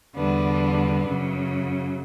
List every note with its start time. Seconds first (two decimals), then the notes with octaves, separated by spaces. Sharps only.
0.15 E2 D3 G3 B3 D4
1.06 F#2 C#3 F#3